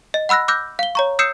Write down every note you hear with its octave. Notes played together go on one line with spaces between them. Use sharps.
D#5
F#5 B5 E6 F#6 A#6
D6 E6 F#6 G6 A#6
F5 G7
C#5 A#5 C#6
D#6 E6 G6 C7 C#7 E7